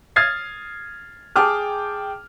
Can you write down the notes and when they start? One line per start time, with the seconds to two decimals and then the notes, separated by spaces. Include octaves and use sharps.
0.16 D#6 F6 G#6 A6 C7
1.36 G#4 G5 A5 D6 D#6 F6